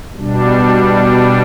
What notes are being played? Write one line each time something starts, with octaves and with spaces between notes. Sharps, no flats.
B2 G3 D4